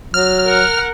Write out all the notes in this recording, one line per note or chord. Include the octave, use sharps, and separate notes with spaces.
F#3 F6
A#4 F#5